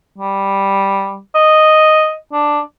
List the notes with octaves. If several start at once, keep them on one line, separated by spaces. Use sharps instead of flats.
G3
D#5
D4